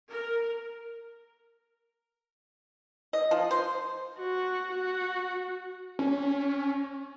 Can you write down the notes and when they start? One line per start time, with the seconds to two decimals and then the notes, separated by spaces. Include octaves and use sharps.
0.10 A#4
3.13 D#5
3.31 F3
3.51 C5
4.19 F#4
4.72 F#4
5.99 C#4